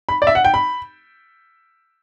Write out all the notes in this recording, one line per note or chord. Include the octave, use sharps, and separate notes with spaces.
B5
D5
E5
F#5
G5
B5